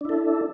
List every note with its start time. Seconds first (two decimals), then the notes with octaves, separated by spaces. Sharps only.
0.01 D4
0.05 E4
0.09 A4